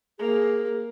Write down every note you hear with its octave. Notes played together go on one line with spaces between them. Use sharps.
A#3 G#4